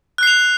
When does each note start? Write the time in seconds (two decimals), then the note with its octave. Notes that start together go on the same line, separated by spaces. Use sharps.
0.18 F#6
0.23 C7
0.27 F7